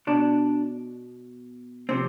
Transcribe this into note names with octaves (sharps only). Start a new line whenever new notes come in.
B2 D4
C3 F3 C4